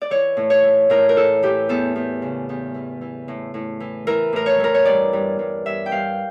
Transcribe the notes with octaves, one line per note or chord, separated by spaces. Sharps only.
D5
E3 C#5
A2
C#5
E3
A2 A#4
A#4
E3 A4
E3 G4
E2 A4
E2
C#3
E2
E3
E3
A2
A2
E3
E3 A#4
A2 A#4
C#5
E3 A#4
C#5
G2 D5
G2
G2
G2 E5
G5
G2 F5